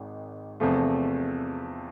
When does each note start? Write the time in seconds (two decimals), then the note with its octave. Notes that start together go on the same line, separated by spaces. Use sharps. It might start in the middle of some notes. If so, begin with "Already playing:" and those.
Already playing: G#1 G#2
0.60 E2 C3 F3 A3